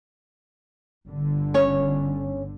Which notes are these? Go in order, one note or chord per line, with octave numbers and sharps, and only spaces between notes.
G1 D3
C#4 C#5